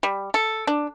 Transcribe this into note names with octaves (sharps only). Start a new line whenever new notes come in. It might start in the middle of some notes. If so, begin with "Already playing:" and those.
G3
A4
D4